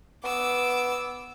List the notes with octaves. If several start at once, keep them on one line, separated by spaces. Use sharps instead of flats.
B3 D6 E6